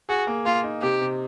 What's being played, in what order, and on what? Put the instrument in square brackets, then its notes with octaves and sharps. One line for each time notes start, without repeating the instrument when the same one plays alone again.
[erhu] F#4 [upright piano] G#4
[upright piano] A#3
[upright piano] A#3 [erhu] F4
[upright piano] D#4
[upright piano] C3 [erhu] G4
[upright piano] C3